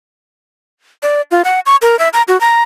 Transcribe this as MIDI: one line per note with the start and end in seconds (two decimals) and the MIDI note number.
1.03 1.22 74
1.31 1.42 65
1.45 1.60 78
1.66 1.76 85
1.82 1.98 70
1.99 2.09 76
2.13 2.22 82
2.28 2.39 66
2.41 2.63 82